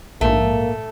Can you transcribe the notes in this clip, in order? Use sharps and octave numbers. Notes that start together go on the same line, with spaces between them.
A#1 G#2 A3 A#3